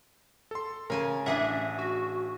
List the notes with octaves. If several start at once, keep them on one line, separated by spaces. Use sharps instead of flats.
A4 C6
C#3 A#4 G#5 A5
A1 D4 G#4 E5 F#5
F#4